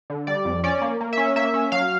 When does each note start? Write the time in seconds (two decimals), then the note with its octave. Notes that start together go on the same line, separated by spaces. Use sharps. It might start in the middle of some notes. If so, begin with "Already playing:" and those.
0.10 D3
0.27 G3 D5
0.45 F2
0.64 C#4 D5
0.82 A#3
1.01 A#3
1.13 C#4 E5
1.36 A#3 E5
1.54 C#4
1.72 F#3 F5